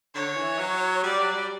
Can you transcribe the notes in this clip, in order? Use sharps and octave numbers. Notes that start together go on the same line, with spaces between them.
D3 C#5
E3
F#3
G3 D5
F#3
G3